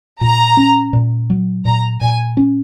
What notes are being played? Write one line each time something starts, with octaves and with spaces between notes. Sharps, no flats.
A#2 A#5
C#4
A#2
F#3
A#2 A#5
A#2 G#5
C#4